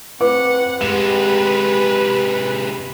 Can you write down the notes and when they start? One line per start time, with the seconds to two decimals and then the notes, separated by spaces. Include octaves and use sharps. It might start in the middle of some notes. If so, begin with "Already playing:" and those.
0.21 C4 B4 F#5 D6
0.81 C3 G#3 G4 B4 E7